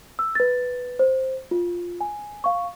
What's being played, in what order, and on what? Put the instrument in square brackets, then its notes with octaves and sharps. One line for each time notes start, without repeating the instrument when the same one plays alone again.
[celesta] E6
B4 A6
C5
F4
G#5
F5 C#6